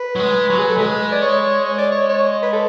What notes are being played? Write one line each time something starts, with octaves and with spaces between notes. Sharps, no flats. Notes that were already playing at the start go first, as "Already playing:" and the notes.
Already playing: B4
F#3
G#3
F#3
G#4
A4
G#3 B4
D5
C#5
C#5
D5
C#5
C#5
B4
A4